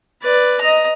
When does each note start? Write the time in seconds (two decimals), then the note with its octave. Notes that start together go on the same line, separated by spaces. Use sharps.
0.22 B4 D5
0.61 D#5 A#5